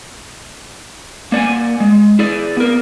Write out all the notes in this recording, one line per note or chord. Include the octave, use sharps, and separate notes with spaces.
A#3 D5 F#5 G#5
G#3
E4 G#4 D5
B3 A#4